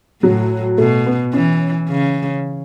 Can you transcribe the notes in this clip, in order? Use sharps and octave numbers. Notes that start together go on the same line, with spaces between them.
A2 F#3
B2 A3
B3
E3 C#4
C#3